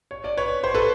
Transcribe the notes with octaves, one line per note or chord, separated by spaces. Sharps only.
C#5
D5
B4 C#5
C5
A4 B4